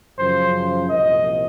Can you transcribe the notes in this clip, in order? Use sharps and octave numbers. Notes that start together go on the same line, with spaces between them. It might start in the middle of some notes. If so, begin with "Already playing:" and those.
F#2 C#3 F3 C5
C2 A#2 F3 D#5